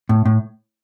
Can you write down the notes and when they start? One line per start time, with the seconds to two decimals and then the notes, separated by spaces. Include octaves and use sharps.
0.09 A2
0.25 A2